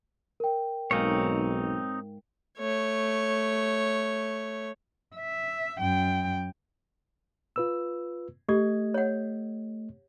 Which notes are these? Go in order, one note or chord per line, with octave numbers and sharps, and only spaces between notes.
A#4 G5
B1 G#2 A#3 C4 D#4 C#5
A3 C#5
E5
F#2 G5
F4 B4 E6
A3 G4 D#5 G#6
C#5 F#5